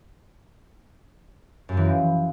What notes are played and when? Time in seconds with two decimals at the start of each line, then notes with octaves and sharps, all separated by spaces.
1.69 F#2
1.77 E3
1.85 F3